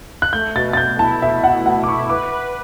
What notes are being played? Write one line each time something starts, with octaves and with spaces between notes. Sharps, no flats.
F#6
A3 G6
B2 A6
A6
B2 G6
E4 A5
B2 E5
B2 F#5
B2 F#5
D6
E4 C#6
B4 D6
B4